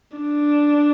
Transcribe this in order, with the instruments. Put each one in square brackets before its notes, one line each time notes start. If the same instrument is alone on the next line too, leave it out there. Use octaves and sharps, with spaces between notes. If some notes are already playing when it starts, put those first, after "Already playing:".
[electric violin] D4